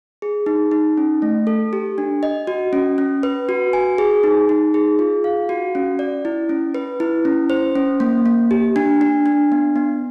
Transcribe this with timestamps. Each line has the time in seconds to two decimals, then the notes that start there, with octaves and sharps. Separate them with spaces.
0.22 G#4
0.46 D#4
0.71 D#4
0.97 C#4
1.22 A3
1.47 A4
1.73 G4
1.98 D4
2.23 D#5
2.47 F#4
2.73 C#4
2.98 C#4
3.23 B4
3.49 F#4
3.73 G#5
3.98 G#4
4.24 D#4
4.49 D#4
4.74 G#4
4.99 F4
5.24 F5
5.49 F#4
5.75 C#4
5.99 D5
6.25 E4
6.49 C#4
6.74 B4
7.00 E4
7.25 C#4
7.50 C5
7.75 C#4
8.00 A#3
8.26 A#3
8.51 G4
8.76 D4
9.01 D4
9.26 D4
9.52 B3
9.76 B3